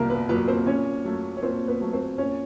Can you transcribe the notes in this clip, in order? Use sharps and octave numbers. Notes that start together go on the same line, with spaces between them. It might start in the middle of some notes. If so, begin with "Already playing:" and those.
Already playing: C2 A#2 F#3 A#3 A#4
B3 B4
A#2 F#3 B3 B4
C4 C5
A#2 C#4 C#5
F#3 A3
C#5
A#2 C4 C5
B3 B4
F#3 A3
C4 C5
A#2 C#4 C#5